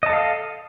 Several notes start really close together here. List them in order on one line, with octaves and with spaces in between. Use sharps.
D#5 A5 A4 F5